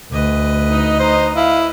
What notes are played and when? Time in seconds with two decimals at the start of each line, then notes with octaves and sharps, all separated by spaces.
0.12 D2 B4 D#5
0.69 D#4
1.00 D#4 C5
1.36 E4 F5